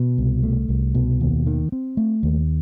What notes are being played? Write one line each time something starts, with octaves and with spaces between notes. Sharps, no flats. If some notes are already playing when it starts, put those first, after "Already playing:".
Already playing: B2
C2
A3
C2
B2
D#2
D#3
C4
A3
D#2